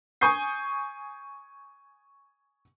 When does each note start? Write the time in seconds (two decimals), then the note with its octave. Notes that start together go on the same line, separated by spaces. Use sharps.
0.21 G#5 C#6 D#6 G6 C7